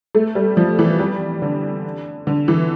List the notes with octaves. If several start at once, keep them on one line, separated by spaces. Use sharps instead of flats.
A3
G3
F3
E3
G3
D3
D3
E3